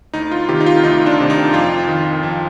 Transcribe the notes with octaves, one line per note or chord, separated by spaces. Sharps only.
D2 D#4
F4
C3 D#3 G4
D#4
F4
D2 D#4
D4
C3 D#3
D#4
F2 F4
D#3
F2